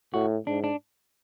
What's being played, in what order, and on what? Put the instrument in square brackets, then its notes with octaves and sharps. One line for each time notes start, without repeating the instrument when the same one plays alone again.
[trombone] A2 [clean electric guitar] F#4
[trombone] G#2 [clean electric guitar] D4
[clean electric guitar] D4